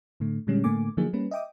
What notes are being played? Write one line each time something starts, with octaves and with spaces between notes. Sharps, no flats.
A2 D3 A3
A#2 D3 G3 G#3 C#4
A2 D3 A3 A#3 G#5 D6
D3 F3 F#3 A#3 D#4 G#4
G3 A#3 C#4 B4
D#5 E5 G5 D6 D#6